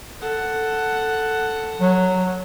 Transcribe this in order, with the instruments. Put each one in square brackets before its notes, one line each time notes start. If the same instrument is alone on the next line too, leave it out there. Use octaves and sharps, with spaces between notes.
[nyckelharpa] A4 F#5
[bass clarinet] F#3